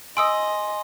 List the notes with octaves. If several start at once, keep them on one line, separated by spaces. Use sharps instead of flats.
D#5 G#5 C6 D#6 E6 D7